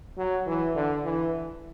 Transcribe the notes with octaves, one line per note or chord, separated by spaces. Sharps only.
F#3
E3
D3
E3